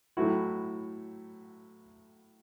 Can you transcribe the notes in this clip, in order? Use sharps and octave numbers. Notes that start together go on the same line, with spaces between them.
A2 F#3 A3 E4 F#4